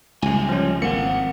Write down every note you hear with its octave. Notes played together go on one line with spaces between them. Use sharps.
C#2 C3 G3 G#5
F3 C#4
G#1 A#3 C4 F#5 C#7